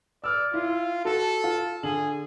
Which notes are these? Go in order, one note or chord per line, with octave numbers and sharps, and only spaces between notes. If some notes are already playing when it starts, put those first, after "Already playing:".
D5 E6 F6
E4 F4
F#4 A4
F4
D3 G#4 F#7